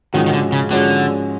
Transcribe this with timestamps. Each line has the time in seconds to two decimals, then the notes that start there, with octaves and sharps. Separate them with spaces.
0.14 G#2 D#3 F3 G#3 C#4 F#4
0.26 D#3
0.33 D3
0.52 C#3
0.71 G#2 D3 F3 G#3 C#4 F#4